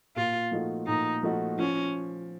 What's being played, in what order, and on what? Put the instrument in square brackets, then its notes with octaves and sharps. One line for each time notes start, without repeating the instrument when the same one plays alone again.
[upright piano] A#2 [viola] F4
[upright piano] F3 A3 D#4 F#4
[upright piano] A#2 [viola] D#4
[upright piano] F3 A3 D#4 F#4
[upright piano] F3 [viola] C#4